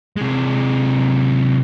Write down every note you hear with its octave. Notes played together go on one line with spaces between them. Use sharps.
C3 G#3